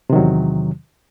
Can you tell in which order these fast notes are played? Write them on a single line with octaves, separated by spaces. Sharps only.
C3 D#3 F#3 E2